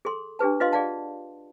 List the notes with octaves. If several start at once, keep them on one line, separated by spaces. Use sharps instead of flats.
G#4 A4 C6
D4 G4 G#4 B4 A5
F4 B4 D#5 F5 C6
G#4 D5 F5 F#5 A5